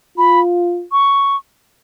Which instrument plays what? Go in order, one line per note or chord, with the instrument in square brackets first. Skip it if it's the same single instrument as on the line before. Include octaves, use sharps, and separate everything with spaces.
[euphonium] F4 [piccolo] B5
[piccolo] C#6